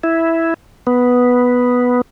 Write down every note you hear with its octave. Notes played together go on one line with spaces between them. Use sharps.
E4
B3